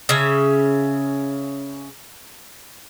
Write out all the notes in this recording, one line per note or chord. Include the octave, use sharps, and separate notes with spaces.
C#3 C#4 E5